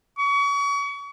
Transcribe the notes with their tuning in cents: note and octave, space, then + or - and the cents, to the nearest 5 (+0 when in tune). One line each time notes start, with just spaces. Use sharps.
C#6 +35